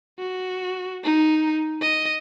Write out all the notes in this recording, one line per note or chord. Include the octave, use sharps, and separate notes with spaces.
F#4
D#4
D#5